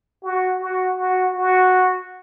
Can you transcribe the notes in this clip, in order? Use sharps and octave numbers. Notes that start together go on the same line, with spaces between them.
F#4
F#4
F#4
F#4